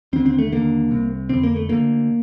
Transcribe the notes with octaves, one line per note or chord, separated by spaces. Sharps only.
D#2 D3 C4
C4
A3
D#2 D3 A#3
C2 C3
F2 D3 C4
A#3
A3
D2 D3 A#3